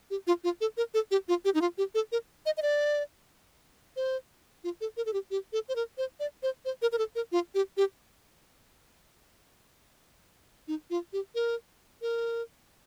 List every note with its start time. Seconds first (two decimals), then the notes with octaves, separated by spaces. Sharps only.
0.10 G4
0.27 F4
0.44 F4
0.61 A4
0.77 A#4
0.94 A4
1.11 G4
1.28 F4
1.45 G4
1.54 D#4
1.61 F4
1.78 G4
1.95 A4
2.12 A#4
2.46 D#5
2.57 D#5
2.62 D5
3.96 C5
4.64 F4
4.81 A4
4.97 A#4
5.06 A4
5.13 G4
5.31 G4
5.53 A4
5.69 C5
5.76 A#4
5.98 C5
6.20 D5
6.43 C5
6.65 C5
6.82 A#4
6.92 A#4
6.98 A4
7.15 A#4
7.32 F4
7.54 G4
7.77 G4
10.68 D#4
10.90 F4
11.13 G4
11.35 A#4
12.02 A#4